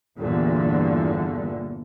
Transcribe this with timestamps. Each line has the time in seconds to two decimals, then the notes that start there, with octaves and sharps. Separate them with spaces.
0.18 G1 E2 G2 A#2 D3